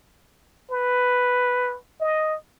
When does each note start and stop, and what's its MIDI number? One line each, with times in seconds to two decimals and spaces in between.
0.71 1.77 71
2.00 2.36 75